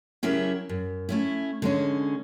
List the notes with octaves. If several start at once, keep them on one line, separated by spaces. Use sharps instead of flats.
C#3 F#3 C#4 E4 G4 A#4
F#2
A3 C#4 E4
D3 G#3 C#4